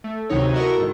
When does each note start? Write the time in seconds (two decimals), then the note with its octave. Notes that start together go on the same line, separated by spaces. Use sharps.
0.04 A3
0.29 D2 C3 D#3 F#3 D#4 C#5
0.53 E4 F#4 A4 A#4 D#5 C#6
0.78 G#2 D#3